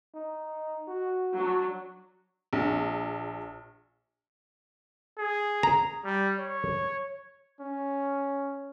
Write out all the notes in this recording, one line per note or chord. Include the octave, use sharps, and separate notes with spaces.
D#4
F#4
F#3 D4
A#1
G#4
A#5
G3
C#5
C#4